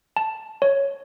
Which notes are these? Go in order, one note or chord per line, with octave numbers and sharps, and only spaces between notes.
A5
C#5